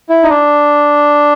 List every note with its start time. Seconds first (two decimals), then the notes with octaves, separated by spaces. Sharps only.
0.09 E4
0.23 D#4
0.29 D4